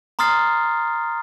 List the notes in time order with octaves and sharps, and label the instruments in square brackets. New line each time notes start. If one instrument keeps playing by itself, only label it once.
[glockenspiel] A#5 C6 D#6 F6 A6 C7